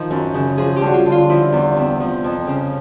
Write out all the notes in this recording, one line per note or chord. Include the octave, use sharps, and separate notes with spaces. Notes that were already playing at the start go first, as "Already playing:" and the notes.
Already playing: D#3 F3
F#2
C#3
F3 G#4
G4
G2
F#4
F4
D3
F4
F3 E4
E2
C3
F3
F2
C#3